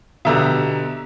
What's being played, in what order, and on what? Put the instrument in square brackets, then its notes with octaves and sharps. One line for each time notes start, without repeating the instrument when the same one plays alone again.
[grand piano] B2 D3 G4 [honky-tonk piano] E5 A#5 E6